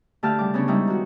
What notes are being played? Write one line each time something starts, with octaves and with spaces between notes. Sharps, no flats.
D3 A3 G4 F5 A5 F6
C#3 G3 D6
C#3 B3 C#4 D4 C#5
G3 G#3 D#4 E4
D#3 F#4